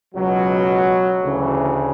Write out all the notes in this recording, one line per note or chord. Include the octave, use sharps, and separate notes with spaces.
C#2 B2 F#3
D2 C#3 E3